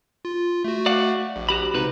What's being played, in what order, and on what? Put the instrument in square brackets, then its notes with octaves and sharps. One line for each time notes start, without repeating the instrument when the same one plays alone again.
[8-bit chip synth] F4
A3 F#4
[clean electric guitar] D5 F5 F#5
[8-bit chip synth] A#1
[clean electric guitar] F#4 G4 B5
[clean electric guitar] C#2 C3 B4 [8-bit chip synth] D#4